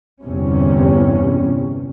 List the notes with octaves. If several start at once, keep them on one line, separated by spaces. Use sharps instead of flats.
G1 E2 G2 C3 G3 C#4